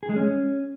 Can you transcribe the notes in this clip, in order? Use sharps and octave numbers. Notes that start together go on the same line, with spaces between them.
G#4
G#3
C#4